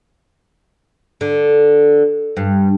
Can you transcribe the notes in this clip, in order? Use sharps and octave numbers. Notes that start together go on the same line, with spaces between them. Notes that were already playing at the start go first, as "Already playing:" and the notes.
D3
G2